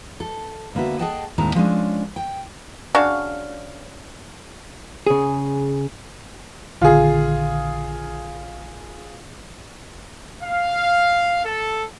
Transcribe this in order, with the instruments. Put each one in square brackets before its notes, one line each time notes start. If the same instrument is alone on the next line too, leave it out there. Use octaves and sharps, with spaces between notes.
[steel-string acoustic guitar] A4
D3 A#3 B3 F#4 E5
G#4 A4 D#5 F#5 G5 A5
D#2 A2 G#3 C4 E4 A#5
F3 G#3 C#4 D4
G5
[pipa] C#3 D4 F#4 F5
[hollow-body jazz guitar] C#3 G#4
[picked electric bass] A#1 D3 D#3 [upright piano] F4 G#4
[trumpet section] F5
A4